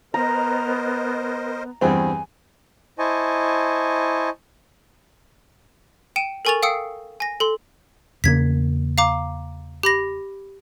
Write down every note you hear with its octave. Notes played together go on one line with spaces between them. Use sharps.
B3 A#4 C5 D#5 A#5
E2 G2 C4 G#5
E4 C5 D#5 G#5 A5 C#6
G5 C#7 D#7 E7
A4 A#4 G#5 C#6 A6 F7
F5 G5 D#6 E6 C7 C#7
G#5 A#6
A4 C6
E2 C#3 A#3 G#6 B6
F5 A#5 D6
G4 B5 A#6